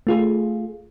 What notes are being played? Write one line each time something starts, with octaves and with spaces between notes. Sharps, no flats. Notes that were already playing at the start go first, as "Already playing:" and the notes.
A3 F4 G#4